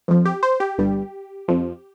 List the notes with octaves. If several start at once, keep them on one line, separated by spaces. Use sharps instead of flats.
F2 F3
G4
C5
G4
G1 G2 G3
F2 F3